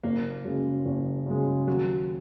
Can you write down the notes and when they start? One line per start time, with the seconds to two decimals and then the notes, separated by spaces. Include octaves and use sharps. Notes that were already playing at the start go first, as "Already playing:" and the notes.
0.04 F#1 A#3
0.44 F#2 C#3 G#3
0.86 F#1
1.26 F#2 C#3 G#3
1.67 D#2 F#3